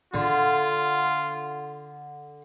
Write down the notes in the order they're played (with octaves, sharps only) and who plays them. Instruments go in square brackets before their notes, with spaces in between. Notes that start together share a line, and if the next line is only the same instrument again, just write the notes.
[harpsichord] D3 [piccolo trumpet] F4